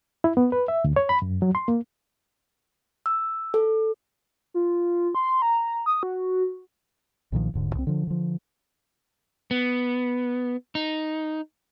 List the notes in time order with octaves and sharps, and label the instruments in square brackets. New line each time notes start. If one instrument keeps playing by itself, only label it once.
[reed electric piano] E4
B3
B4
E5
D2
C#5
B5
F#2
F#3
C6
A#3
[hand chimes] E6
A4
[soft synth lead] F4
C6
A#5
D#6
F#4
[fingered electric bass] B1 A#2 D#3 F3
D#1 G#2 D3
C2 C4
D3 F3
D3 F3
[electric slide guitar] B3
D#4